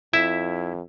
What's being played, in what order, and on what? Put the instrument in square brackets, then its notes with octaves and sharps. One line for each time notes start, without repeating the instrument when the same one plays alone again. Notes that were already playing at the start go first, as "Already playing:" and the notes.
[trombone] F2 [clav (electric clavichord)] E4 E5